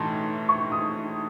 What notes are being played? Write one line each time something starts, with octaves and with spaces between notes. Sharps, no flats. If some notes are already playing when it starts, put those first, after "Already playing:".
Already playing: A2 E3 A3 D#4 A5 C6
C#6
D#6